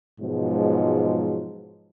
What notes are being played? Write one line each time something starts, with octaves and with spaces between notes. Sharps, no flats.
G#2 B2 F3 F#3 G#3